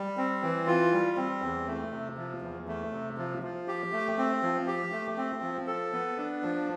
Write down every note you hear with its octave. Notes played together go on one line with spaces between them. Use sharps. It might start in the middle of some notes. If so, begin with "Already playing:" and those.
Already playing: G3
C4
E3
F4
G3
C4
E2
A3
C3
F3
E2
A3
C3
F3
F3
G4
A3
C4
F3
G4
A3
C4
F3
A4
B3
D4
F3